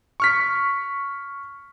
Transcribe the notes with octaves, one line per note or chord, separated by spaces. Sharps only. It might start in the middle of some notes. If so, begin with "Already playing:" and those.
C#6 F6 B6